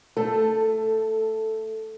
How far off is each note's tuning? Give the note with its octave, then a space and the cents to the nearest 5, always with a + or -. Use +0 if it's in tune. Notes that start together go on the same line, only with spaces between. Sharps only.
A3 +15 A4 +0